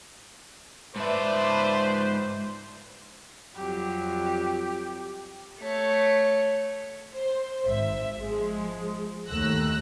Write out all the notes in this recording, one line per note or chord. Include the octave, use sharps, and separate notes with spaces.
G#2 B4 C5 D5 E5 A5
F2 F#3 G3 G4
A3 C#5
C5
G#1 E5
F3 G#3
D#2 A3 E6 F#6 A#6